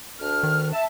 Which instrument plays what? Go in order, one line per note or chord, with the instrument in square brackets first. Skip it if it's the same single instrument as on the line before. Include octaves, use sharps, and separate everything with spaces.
[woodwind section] D2 D4 F6
[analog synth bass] D#3
[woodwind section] E5 A5